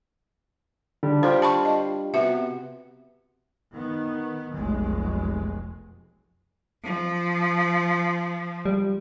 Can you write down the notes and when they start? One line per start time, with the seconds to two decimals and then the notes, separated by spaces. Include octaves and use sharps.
1.03 D3 G3 D4
1.23 F4 G4 C5 G5
1.42 A5 B5 C#6
1.65 D#5
2.14 C3 B3 F#4 E5
3.72 D#3 B3
4.54 F1 B1 G#3
6.83 F3
8.66 G3